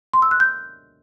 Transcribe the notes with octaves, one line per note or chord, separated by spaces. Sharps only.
C6
E6
F#6
G6